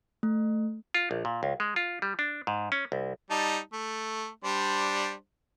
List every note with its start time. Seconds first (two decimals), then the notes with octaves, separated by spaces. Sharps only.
0.23 A3
0.94 F4
1.11 A#1
1.25 A#2
1.43 C#2
1.60 G#3
1.76 F4
2.02 G3
2.19 D4
2.47 G#2
2.72 C#4
2.92 C2
3.31 G3 D#4 A5
3.73 A3
4.44 G3 D4 C5